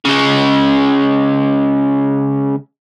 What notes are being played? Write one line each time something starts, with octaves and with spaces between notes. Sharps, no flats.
C#3 G#3